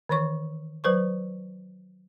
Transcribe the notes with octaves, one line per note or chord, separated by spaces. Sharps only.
D#3 E3 C#5 C#6
F#3 B4 C5 C#6